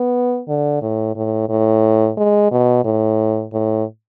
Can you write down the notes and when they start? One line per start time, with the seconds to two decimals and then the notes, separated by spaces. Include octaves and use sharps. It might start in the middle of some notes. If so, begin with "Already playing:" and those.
Already playing: B3
0.48 D3
0.82 A2
1.16 A2
1.49 A2
2.17 G#3
2.51 B2
2.85 A2
3.53 A2